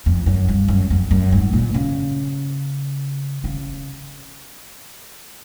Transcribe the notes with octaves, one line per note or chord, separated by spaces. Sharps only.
F2
F#2
G2
F#2
F2
F#2
G#2
A#2
C#3
C#3